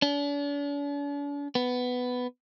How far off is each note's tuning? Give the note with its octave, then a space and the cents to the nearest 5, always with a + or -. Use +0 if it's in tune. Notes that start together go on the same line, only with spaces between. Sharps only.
D4 -45
B3 +10